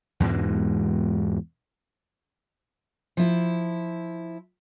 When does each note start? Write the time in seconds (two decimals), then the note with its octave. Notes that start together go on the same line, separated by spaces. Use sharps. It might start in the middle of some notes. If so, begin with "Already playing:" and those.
0.20 E2 G#2 B2 G#3
3.17 F3 E4